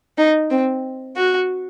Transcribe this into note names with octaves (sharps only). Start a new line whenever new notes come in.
D#4
C4
F#4